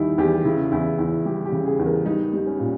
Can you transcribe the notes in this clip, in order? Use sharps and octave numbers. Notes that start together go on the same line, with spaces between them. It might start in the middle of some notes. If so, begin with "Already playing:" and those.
Already playing: E2 D#3 G3 D#4 E4
E2 G4
C#3 E4
E2 E4
E2 E4
G3 G4
G4
C#3
G#4
E2
A#4
G3 D#4
G3 D#4
C#4
A#2